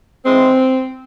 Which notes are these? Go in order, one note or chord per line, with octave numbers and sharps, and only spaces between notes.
G#2 E3 G#3 C4